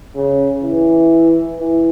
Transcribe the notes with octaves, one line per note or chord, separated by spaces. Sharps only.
C#3
E3
E3